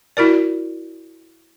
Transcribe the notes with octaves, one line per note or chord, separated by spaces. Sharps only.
E4 F#4 A#4 D5